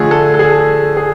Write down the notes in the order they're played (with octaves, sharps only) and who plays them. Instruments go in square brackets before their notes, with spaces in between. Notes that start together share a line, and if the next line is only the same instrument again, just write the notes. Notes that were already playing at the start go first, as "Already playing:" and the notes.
Already playing: [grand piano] D3 F3 A3 G#4
A4
A4
G#4
G#4